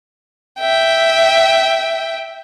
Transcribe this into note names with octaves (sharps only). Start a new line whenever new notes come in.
E5 G5